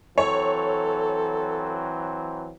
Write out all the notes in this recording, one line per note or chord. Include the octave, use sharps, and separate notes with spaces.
E3 F#3 C4 A4 C#5